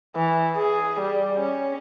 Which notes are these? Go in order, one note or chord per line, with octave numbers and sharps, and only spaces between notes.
E3
G#4
G3
C#4